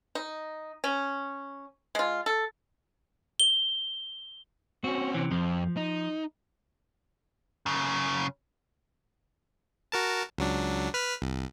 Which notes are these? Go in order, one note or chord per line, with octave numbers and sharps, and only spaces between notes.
D#4
C#4
G#3 F4
A4
G7
C4 C#4 F#4
C3 E3
F2 F3
D#4
F#2 C#3
F#4 A#4 A5
C#2 F#3 D4
B4 F6 B6
C2